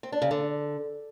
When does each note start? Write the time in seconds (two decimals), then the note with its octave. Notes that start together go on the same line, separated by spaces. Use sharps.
0.03 C4
0.12 D4
0.22 C#3
0.31 D3